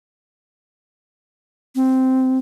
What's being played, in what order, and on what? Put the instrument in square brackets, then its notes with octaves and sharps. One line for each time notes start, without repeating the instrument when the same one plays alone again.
[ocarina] C4